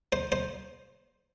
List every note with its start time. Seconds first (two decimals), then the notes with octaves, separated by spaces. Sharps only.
0.12 C5
0.32 C5